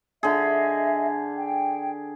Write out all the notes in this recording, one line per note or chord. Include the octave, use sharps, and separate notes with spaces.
D3 G#4 D#5 E5
G5